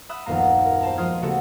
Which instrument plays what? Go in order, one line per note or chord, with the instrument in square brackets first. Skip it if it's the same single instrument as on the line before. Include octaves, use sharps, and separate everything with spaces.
[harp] E5 B5 D#6 F#6
D#1 A#1 F#2 B3 F5 A#5
A#4
C5 A5 A#5
F3 G#3 F4 D#6 F6 G#6
C#3 A3 B3 F#4 G4 A4